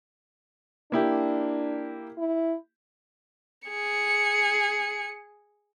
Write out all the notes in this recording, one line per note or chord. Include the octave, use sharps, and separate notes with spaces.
A#3 D4 E4 G4
E4
G#4 C#7